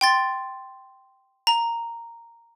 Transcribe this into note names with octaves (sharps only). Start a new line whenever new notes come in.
G5 C6 A6
A#5